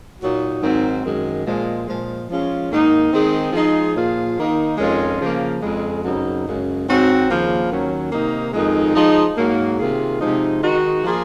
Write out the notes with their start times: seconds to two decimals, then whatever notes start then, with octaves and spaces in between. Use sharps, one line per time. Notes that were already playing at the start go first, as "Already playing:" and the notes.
0.20 A#2 F#3 A#3 D#4 F#4
0.61 G#2 D#3 F#3 C4
1.04 F#2 D#3 G#3
1.45 A#2 F3 G#3
1.87 A#2 F3 G#3
2.28 F3 G#3 C#4 F4
2.70 G#2 D#3 A#3 D#4
3.11 D#3 G#3 C4 D#4 G#4
3.53 F3 G#3 D#4 G#4
3.95 A#2 F3 A#3 F4 G#4
4.36 D#3 A#3 D#4
4.78 F2 D#3 G#3 C#4 F4
5.20 C#3 F3 A#3
5.61 F2 C#3 G#3
6.03 F#2 C#3 F#3 C4 D#4
6.45 F#2 C#3 G#3
6.86 G#2 F#3 C4 F#4
7.28 D#2 C#3 F3 A#3
7.70 D#2 D#3 F#3 C#4
8.12 C3 D#3 A#3 D#4
8.53 F2 D#3 G#3 D#4
8.95 F3 G#3 D#4
9.36 G#2 F#3 A#3
9.78 C3 D#3 A#3 F4 G#4
10.19 C3 F3 G#3 D#4
10.62 D#3 G#3 D#4 F#4
11.03 F3 A#3 F4 G#4